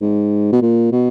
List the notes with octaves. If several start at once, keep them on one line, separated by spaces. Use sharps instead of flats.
G#2
B2
A#2
B2